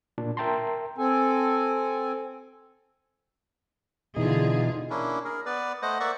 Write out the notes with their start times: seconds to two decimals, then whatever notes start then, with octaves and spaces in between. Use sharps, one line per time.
0.18 A#2 D4
0.37 A#4 E5 G5 A5 A#5 C6
0.98 C4 A4 G#5
4.16 B2 D3 E3 D#4 F4 G#4
4.90 A#3 C#4 D4 E4
5.25 G#4 A#4
5.46 B3 B4 D5
5.82 A3 C5 D#5 F#5
6.00 A#3 D5 E5 F#5 C#6